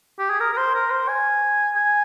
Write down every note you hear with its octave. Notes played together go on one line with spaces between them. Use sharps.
G4
G#4
A#4
A#4
C5
A#4
C5
G#5
G#5